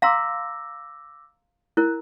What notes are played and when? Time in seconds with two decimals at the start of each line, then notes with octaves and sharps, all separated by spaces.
0.02 F5 A#5 C6 D6 E6 A#6
1.77 E4 A#4 F#6